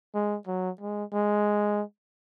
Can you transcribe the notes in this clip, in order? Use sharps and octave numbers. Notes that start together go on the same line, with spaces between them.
G#3
F#3
G#3
G#3